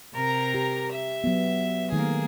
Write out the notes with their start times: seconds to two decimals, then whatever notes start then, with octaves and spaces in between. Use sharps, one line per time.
0.14 C3 A#4 A#5
0.54 G4
0.93 E5
1.24 F#3 B3
1.92 D#3 A3 A#3 G#4